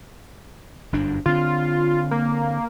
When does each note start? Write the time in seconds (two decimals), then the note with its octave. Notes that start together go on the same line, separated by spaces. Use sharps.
0.93 G1 F#2 D4
1.26 D3 C4 F4
2.11 A#3